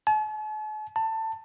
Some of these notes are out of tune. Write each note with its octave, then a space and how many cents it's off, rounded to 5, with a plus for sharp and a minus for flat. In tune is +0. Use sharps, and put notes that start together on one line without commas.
A5 -45
A5 +20